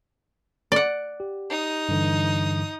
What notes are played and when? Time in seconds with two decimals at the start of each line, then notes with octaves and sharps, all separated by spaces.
0.72 D5 F#5
1.20 G4
1.50 D#4 D#6
1.89 G2 D3 E3